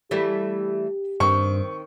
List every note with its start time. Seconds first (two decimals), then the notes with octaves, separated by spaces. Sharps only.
0.11 E3 G3 A3 G4
1.20 G2 D#3 C4 C#6